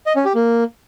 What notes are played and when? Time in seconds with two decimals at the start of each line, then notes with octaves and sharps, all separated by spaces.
0.06 D#5
0.16 C#4
0.25 G4
0.35 A#3